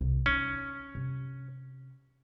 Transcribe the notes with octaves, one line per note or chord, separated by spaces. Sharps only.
C2
C#4 D#4
C3